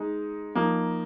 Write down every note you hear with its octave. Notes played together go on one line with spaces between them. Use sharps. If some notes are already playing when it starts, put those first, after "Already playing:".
Already playing: G#3 D#4
F3 A#3 D#4